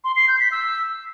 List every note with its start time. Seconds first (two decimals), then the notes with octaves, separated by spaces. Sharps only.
0.04 C6
0.16 C7
0.28 G6
0.40 B6
0.52 E6